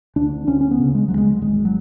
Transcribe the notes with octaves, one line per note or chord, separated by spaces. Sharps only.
D2 D4
D2 C#4
C#4
B3
C#3
G#3
D2 F#3
G#3
G#1 G#3
F#3